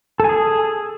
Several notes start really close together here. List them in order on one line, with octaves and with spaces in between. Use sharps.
A4 G#5 G#4